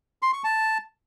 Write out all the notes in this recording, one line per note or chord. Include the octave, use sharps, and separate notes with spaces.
C6
C#6
A5